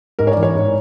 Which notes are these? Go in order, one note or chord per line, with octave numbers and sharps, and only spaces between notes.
G#2 A#4
C#5
D5
E3
C#5
G#2